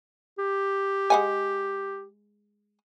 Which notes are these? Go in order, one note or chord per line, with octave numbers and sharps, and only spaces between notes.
G4
G#3 F#5 G#5